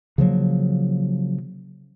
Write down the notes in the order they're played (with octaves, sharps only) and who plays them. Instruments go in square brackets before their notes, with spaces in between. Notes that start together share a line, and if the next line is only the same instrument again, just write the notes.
[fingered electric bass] C#3 F3 F#3 A#3